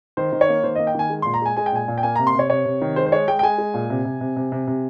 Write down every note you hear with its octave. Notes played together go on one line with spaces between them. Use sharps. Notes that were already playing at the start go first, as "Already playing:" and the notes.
D#3 C5
D#3
C#5
A#3
D#3 C5
A#3 D#5
G5
D#3 G#5
G#3
A#2 C6
A#5
G#3 G#5
G#3 G#5
G5
A#2 G#5
A#2
G5
A#3 G#5
C3 A#5
C6
C3 C#5
C3 C#5
C3
D#3
G#3 C5
C5
G#3 C#5
G#3 G5
G5
G#3 G#5
G#3
A#2
C3
C3
C3
C3
C3
C3